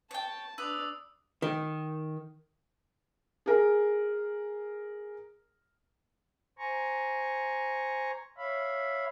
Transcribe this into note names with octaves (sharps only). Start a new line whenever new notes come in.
C#5 G5 A5
D4 B4 D5 D#6 E6
D#3
G#4 A#4
C5 G#5 A#5 C#6
C#5 E5 F5 B5